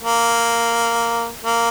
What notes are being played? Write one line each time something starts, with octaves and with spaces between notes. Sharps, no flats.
A#3
A#3